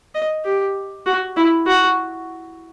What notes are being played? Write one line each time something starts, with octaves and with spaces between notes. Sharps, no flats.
D#5
G4
F#4
E4
F#4